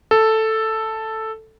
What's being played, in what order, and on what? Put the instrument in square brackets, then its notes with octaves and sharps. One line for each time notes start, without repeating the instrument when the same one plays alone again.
[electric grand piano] A4